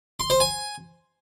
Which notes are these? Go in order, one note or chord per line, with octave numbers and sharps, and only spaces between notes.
C6
C5
G#5